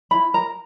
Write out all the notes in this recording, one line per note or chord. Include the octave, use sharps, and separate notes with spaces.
E4 B5
A#4 A#5